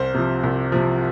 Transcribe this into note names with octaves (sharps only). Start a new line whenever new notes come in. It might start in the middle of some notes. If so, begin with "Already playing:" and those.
Already playing: C2 C5
C3 F3
C2
C3 F3